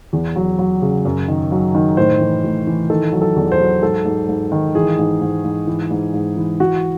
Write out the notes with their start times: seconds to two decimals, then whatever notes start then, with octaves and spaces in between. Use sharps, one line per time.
0.13 E2
0.36 F#3
0.59 F#3
0.82 C#3
1.05 F#2
1.28 D#3
1.52 F#3
1.75 D#3
1.97 A2 C5
2.21 E3
2.44 A2
2.67 E3
2.90 D#3 A4
3.13 F#3
3.21 A4
3.36 E2
3.52 C5
3.60 F#3
3.82 G#2 A4
4.05 G#2
4.28 G#2
4.52 D#3
4.75 E3 G#4
4.98 G#2
5.21 G#2
5.45 G#2
5.67 E3
5.91 G#2
6.14 G#2
6.37 E3
6.60 E3 F#4